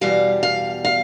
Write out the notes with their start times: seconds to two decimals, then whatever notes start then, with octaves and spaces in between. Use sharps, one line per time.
0.01 E2 B2 G3 F5
0.43 F5
0.85 F5